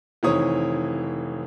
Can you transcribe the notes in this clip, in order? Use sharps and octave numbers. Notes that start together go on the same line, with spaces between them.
F1 D#3 E3 C4 C#5 D#6